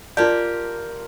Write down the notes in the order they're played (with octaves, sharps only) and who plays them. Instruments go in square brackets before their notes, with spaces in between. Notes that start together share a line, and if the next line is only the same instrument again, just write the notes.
[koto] A#3 G4 [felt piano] F4 A5 [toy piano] D5 [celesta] G6